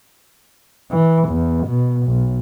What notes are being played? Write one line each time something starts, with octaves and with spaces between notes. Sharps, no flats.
E3
E2
B2
B1